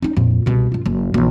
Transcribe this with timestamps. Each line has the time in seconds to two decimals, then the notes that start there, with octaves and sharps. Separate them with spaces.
0.02 C#4 D#4
0.17 F2 A#2
0.46 C2 B2
0.72 F#2 F4
0.86 F#1 F#2
1.14 A#1 E3